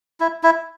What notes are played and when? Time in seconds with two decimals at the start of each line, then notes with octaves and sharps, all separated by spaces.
0.20 E4
0.43 E4